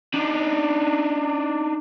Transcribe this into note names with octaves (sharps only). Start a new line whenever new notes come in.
D4 D#4